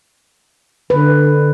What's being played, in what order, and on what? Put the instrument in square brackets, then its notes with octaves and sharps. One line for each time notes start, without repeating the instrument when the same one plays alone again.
[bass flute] D3 [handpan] B4